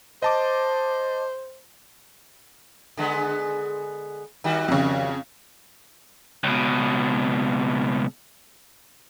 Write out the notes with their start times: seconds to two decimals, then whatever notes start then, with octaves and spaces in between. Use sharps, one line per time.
0.22 C5 D#5 A5 D6
2.97 D3 G#3 B3
4.44 D#3 G3 F#4
4.68 F2 C#3
6.44 C#2 B2